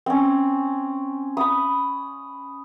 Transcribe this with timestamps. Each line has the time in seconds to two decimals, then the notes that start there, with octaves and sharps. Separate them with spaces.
0.06 C4 C#4
1.37 B5 D#6